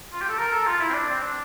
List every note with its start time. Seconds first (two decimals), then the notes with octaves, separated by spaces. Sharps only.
0.13 F4
0.22 G4
0.29 A4
0.38 A#4
0.52 A4
0.67 F4
0.80 E4
0.89 C4
0.94 D4
1.09 C4
1.22 D4